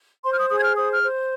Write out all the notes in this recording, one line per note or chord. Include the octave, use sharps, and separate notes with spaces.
C5 C6
F6
D#6
G#4 D#6
G#6
F6
C5 D#6
F6
C5